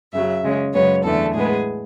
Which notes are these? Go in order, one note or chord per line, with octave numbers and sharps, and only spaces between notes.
F#2 C#3 F#3 E5
C#3 G#3 C#4
F#2 C#3 G#3 B3 C#5
E2 D3 A3 A4
A2 G#3 B3 G#4